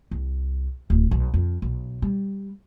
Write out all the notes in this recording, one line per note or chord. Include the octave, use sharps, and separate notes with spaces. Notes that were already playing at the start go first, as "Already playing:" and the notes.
C2
D1
B1
F2
B1
G3